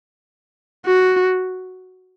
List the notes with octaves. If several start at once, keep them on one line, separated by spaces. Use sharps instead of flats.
F#4